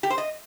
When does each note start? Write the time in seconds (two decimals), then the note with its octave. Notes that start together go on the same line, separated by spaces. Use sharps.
0.03 G4
0.11 C5
0.18 D#5